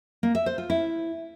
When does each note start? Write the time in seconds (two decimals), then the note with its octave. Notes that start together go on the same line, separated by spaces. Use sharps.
0.23 A#3
0.35 E5
0.46 C5
0.58 F4
0.70 E4